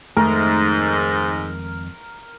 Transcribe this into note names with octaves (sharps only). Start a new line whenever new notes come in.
F2 G#2 D#3 G#3 A3 A#4